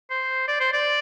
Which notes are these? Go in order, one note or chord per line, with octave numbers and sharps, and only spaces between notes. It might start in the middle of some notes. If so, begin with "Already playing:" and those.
C5
D5
C5
D5